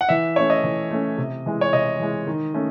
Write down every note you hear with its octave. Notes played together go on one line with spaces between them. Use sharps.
F#5
E3 E5
A3 C#4 C#5
D#5
E3
A3 C#4
C3
E3 G#3
C#5
C3 D#5
E3 G#3
D#3
A3 C#4